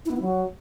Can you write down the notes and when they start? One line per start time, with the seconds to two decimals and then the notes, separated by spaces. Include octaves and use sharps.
0.06 E4
0.11 B3
0.16 E4
0.22 F#3